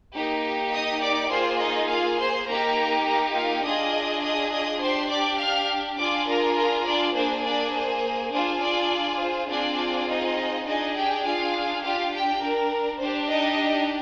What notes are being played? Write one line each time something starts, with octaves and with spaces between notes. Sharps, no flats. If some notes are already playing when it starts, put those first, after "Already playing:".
A#3 D#4 G4
D#5 D#6
D5 D6
A#3 F4 G#4 C5 C6
D#4 D#5
F4 F5
C5 C6
A#3 D#4 G4 A#4 A#5
A#4 A#5
F4 F5
D4 F4 G#4 D#5 D#6
D#5 D#6
D#5 D#6
D4 G4 C5 C6
D5 D6
F5 F6
D4 F4 G#4 D5 D6
A#4 A#5
A#4 A#5
D4 D5
A#3 D4 G#4 C5
D4 D5
C5
D4 F4 G#4 C5
D4 D5
C5
C4 D4 F4 G#4 D5
D#4 D#5
D4 D#4 G#4 D#5
G4 G5
F4 F5
D4 F4 G4 F5
G4 G5
A#4
D4 G4 C5
D#4 D#5